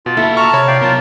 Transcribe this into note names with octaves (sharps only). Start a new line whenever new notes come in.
B2 F4
A#3 E4 F#4 A4 F#5
A5 A#5 C#6 F6
C3 C#5 B5
D5 F5 G5
F#3 B3 F4 A#4 A5